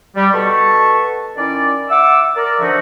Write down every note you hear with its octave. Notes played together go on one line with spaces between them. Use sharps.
G3
B2 A4 B4 A5 C#6
D#3 C#4 E4 D5
E5 F#5 D6 E6
A#4 D5
D3 F3 D4 D#4 F#4 E5